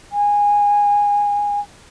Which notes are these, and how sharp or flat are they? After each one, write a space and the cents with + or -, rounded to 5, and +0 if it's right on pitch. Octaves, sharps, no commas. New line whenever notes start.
G#5 -20